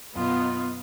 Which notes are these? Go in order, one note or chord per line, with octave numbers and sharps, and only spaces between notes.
F#2 B2 B3 D#4 F4